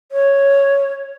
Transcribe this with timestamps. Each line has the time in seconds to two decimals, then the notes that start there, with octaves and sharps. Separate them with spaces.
0.12 C#5